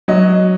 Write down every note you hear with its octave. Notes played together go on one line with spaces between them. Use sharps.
F#3 D#5